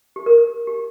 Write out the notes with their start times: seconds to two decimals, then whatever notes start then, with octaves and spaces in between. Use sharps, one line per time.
0.16 G4
0.26 A#4
0.67 G4